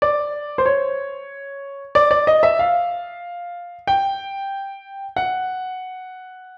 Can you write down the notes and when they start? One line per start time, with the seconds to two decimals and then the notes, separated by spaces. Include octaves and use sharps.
0.02 D5
0.58 C5
0.66 C#5
1.95 D5
2.11 D5
2.27 D#5
2.43 E5
2.59 F5
3.87 G5
5.16 F#5